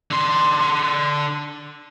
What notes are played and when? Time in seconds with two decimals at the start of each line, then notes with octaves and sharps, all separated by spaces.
0.11 D3 C6